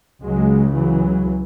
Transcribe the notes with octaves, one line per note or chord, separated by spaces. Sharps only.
C#2 C#3 F#3 G#3
E3 F#3